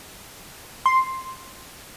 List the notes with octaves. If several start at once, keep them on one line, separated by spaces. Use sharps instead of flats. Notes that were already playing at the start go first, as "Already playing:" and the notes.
C6